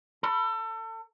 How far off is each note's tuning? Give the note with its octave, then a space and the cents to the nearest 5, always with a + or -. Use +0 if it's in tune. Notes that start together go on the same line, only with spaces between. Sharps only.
A4 +30 B5 +0